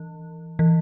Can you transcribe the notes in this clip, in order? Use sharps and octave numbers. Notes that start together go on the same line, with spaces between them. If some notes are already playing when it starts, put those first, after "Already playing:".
Already playing: E3
E3